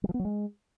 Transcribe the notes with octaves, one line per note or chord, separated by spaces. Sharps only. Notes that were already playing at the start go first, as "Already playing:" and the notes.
G3
F3
B3
F#3
G#3